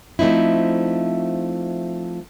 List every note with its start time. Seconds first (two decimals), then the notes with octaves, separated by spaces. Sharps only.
0.19 F3 A3 C4 D#4 E4